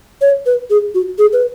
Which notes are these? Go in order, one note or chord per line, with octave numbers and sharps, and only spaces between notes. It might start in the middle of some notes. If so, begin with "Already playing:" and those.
C#5
B4
G#4
F#4
G#4
B4